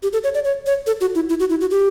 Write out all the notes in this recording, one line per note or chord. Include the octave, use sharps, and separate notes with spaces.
G4
A4
C#5
D5
C#5
C#5
A4
F#4
E4
E4
F#4
E4
F#4
G4